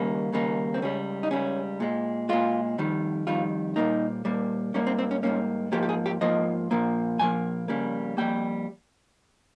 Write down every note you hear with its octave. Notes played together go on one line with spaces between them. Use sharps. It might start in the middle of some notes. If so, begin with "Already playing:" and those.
Already playing: D#2 C#3 G3 A#3
D#2 C#3 G3 A#3
C4
C#2 C#3 G3 C#4
D#4
C#2 C#3 G3 C#4
A#2 G#3
A#2 G#3 F4
F2 D#3 G3
F2 D#3 G3 F4
A#2 G3 A#3 D#4
A#2 G3 A#3
G#2 G3 A#3 C#4
C4
C4
C#4
G#2 G3 A#3 C#4
G#2 F3 A#3 G4
G4
G#4
G4
G#2 F3 A#3 D#5
A#2 F3 A#3
A#2 F3 A#3 G#5
F2 C#3 G3 A#3
F2 C#3 G3 A#3 G5